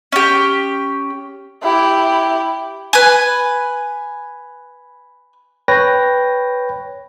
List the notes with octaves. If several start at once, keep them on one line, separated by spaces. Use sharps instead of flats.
C#4 G4
E4 G4
B4 G#5
B4 C#5 G5 A#6